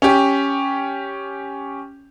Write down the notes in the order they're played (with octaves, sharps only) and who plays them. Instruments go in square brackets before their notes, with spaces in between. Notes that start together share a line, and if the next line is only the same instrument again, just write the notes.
[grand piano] C#4 G4